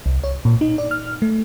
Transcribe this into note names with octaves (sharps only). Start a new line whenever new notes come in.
C2
C#5
A#2
D#4
D5
F6
A3